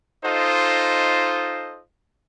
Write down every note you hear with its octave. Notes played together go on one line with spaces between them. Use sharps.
D#4 F4 A4 C5 D#5